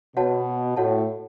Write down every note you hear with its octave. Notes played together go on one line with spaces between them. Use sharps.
B2 F#4 C#5 F#5 A5
A2 F#4 C#5 F#5 A5